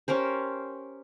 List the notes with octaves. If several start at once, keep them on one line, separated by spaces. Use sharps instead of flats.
C#4 G4 A#4 C5